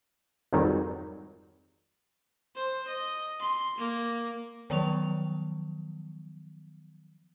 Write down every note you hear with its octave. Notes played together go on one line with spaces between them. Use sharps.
F2 G#2 D#3 F#3 G3
C5
D#5
C6
A#3
D#3 F3 F#3 B3 C#6 F7